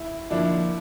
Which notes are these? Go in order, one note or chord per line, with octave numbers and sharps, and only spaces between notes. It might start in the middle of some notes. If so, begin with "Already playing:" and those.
Already playing: E4
D3 F3 A#3 D4 E4